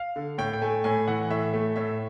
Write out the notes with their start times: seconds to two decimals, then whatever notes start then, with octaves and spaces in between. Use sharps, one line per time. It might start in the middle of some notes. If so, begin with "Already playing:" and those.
Already playing: F5
0.16 D3
0.38 A2 G5
0.53 G5
0.61 A3 G#5
0.84 A2 G#5
1.07 E3 F#5
1.30 A2 E5
1.53 A3
1.76 A2 E5